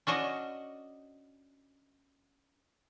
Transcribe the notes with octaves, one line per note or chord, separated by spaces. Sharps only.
C#4 D4 F#4 D#5